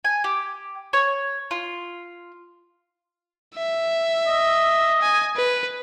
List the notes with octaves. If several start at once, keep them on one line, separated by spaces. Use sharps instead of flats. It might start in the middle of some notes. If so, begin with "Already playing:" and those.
G#5
G4
C#5
F4
E5
D#5
G#5
B4